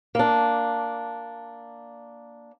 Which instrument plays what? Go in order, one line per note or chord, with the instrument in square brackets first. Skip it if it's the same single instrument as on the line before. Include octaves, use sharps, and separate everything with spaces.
[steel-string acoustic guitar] A#3 D4